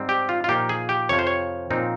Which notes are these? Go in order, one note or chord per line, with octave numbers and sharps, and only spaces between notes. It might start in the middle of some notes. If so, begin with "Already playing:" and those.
Already playing: G#2 G3 C4 D#4
G4
F4
F4
A#2 F3 A#3 D#4 G4
G#4
G4
F2 C3 F3 C#5
C5
C#5
A#2 F3 C4 D#4